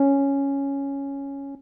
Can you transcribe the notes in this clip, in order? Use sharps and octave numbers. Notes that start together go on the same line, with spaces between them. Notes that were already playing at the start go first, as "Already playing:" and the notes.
Already playing: C#4